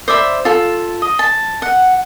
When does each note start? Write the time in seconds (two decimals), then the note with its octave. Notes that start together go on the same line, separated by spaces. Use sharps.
0.08 C5 D5 E5 B5
0.45 F4 A4
1.02 D#5
1.19 A5
1.62 F#5